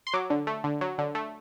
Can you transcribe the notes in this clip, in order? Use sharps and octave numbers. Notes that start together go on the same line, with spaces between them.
C6
F#3 D6
D3
A3
D3
F#3
D3
A3